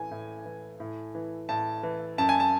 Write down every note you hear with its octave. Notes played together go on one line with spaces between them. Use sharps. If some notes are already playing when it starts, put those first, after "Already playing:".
Already playing: A2 E3 G#5
A2
E3
A2
E3
A2 A5
E3
F#2 A5
G#5
A5